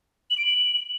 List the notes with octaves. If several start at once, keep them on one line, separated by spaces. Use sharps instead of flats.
F#7
D7
F#7